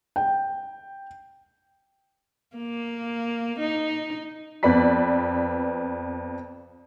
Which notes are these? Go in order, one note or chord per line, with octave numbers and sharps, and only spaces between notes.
G5
A#3
D#4
F2 B3 D5 B5 B6